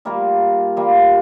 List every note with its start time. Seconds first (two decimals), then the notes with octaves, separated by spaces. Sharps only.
0.05 G3 A#3 F4 A#4
0.77 G3 A#3 F4 A#4